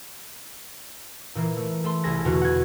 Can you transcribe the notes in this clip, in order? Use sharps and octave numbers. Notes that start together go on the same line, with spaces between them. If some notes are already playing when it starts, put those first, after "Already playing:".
A#2 E3 A#3
A3
A3 A4 C6
C2 E4 G#4 G#5 A#6
E2 B2 D3 F4 F#4
F#5 G#6